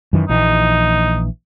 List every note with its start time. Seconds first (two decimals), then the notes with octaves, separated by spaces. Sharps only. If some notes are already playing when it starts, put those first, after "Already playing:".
0.13 F#2 D#3 E3
0.29 A#1 E3 D#4